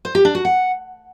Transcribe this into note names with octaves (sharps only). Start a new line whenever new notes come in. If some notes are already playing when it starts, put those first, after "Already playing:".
C5
G4
D4
F#4
F#5